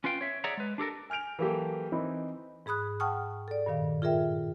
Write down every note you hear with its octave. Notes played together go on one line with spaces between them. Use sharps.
C#4 F4 B4 F5 G5
C#5 E5
G#4 C#5 D5 E5 F#5 A#5
G#3 B4
D4 G4 A4 A#4
G#5 F6 G6 D7 F7
E3 F#3 A#3 F#4 G4 A4
E3 C4 D#4 E4
G#2 G#4 B5 D#6 F#6
F#5 G5 A5 C#6 D#6 F6
A4 D5
G2 A#2 D#3 F5
F4 G#4 A#4 E5 G5